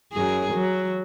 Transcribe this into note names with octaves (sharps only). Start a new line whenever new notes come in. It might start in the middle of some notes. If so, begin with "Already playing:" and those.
F#2 G#4
F#3